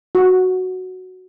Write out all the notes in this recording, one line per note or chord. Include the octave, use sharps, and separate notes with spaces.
F#4